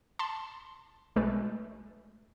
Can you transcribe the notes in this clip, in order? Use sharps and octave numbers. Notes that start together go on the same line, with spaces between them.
A5 B5 C6
B1 G#3 A3 B4